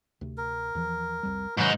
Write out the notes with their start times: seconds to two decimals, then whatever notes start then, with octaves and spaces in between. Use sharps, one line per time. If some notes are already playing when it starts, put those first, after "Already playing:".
0.21 D2 C3
0.38 A#4
0.75 E2 E3 F3
1.23 C2 F2 G3
1.58 G#2 C3 D#3 F#3 C#4 D#4 B4